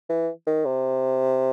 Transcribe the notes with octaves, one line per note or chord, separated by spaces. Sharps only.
E3
D#3
C3